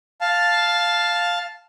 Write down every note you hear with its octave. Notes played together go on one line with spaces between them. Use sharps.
F5 A5